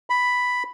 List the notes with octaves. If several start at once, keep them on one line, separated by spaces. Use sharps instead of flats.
B5